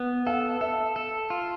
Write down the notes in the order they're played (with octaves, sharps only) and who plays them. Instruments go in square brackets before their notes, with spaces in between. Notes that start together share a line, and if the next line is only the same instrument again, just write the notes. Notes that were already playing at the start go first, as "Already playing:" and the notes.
Already playing: [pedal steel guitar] B3
[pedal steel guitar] A4 [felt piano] F5
[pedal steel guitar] A4 [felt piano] E5
[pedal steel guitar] A4
F4